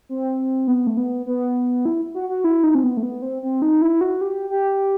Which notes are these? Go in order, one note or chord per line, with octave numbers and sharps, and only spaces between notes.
C4
B3
A3
B3
B3
E4
F#4
F#4
E4
D#4
C4
B3
A3
B3
C4
C4
D#4
E4
F#4
G4
G4